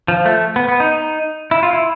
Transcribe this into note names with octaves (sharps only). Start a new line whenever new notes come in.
F3
A3
B3
B3
D#4
E4
F4
E4